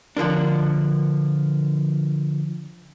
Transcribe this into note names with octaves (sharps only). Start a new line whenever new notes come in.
D3 F3 A#3 D4